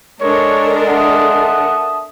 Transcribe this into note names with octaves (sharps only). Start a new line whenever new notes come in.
G#3 D4 A4 A#4 C#5
E5 F#5 A5 D#6